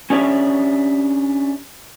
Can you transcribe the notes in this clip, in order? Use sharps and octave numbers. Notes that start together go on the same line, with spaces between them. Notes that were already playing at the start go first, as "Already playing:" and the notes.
C#4 D4 G4 C#5 D#5 E5